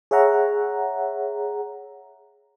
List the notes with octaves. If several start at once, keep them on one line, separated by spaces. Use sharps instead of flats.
G#4 C#5 E5 F#5 A#5